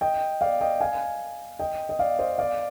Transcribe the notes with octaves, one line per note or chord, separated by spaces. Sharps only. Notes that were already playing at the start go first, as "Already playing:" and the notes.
D#5 G5
D5 F5
D#5 G5
F5 G#5
D#5 G5
D#5
D5 F5
C5 D#5
D5 F5